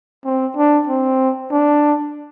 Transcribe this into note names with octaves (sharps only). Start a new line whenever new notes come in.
C4
D4
C4
D4